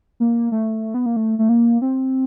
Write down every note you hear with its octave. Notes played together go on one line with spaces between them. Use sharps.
A#3
A3
B3
A#3
A3
A3
A#3
C4